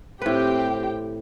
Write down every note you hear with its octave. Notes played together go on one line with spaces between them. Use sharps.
A2 C4 G4 B4 G5